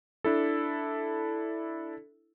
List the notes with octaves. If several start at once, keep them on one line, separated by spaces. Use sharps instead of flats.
D4 E4 A4